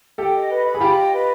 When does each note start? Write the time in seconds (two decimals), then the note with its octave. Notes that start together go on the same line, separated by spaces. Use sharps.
0.18 G4 A4 G5
0.33 D#5
0.50 B4
0.65 B5
0.75 G#4
0.80 F4 G4 G5
0.96 D#5
1.12 B4